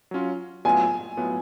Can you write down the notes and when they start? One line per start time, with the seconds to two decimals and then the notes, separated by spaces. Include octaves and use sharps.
0.11 F#3 C#4 F4
0.65 A2 F#3 B3 F4 G#5
1.17 A2 F#3 B3 F4